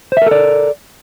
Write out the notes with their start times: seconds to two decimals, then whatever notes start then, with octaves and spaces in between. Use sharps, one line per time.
0.12 C5
0.17 E5
0.22 A#4
0.27 A4
0.31 D5